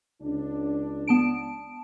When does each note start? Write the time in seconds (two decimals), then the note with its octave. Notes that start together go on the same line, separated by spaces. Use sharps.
0.22 C#2 D4
1.08 B3 A5 D7